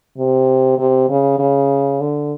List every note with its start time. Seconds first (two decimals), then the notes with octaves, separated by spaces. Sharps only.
0.18 C3
0.78 C3
1.09 C#3
1.39 C#3
2.01 D3